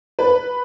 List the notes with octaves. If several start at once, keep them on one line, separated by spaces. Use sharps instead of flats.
B4